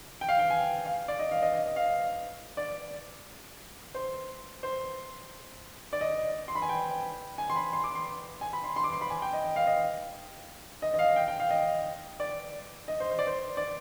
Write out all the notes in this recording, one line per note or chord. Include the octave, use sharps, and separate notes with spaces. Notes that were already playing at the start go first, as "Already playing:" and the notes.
G5
F5
G5
G#5
F5
D5
D#5
F5
D#5
D#5
D#5
F5
D5
C5
C5
D5
D#5
C6
B5
G#5
G5
G#5
C6
B5
C6
D6
C6
G#5
B5
C6
C6
D6
C6
B5
G#5
G5
D#5
G5
F5
D#5
D#5
D#5
F5
G5
G5
F5
D#5
D5
D#5
C5
C5
D5
C5
D5